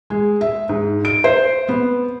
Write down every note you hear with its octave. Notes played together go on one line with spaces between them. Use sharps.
G#3
E5
G#2
D7
C5
B3